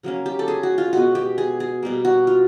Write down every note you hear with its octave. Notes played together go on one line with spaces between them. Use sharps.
C#3 F#3 A#3 C#4
G4
A4
G#4
F#4
F4
B2 G#3 B3 F#4
G4
G#4
G#4
B2 G3 A#3
F#4
F4